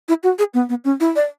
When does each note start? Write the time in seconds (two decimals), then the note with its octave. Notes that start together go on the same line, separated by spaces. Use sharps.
0.08 E4
0.23 F#4
0.39 G#4
0.54 B3
0.69 B3
0.85 C#4
1.00 E4
1.16 D5